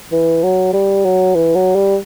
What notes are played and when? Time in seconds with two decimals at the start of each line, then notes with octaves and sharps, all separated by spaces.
0.12 E3
0.43 F#3
0.73 G3
1.05 F#3
1.35 E3
1.55 F#3
1.75 G3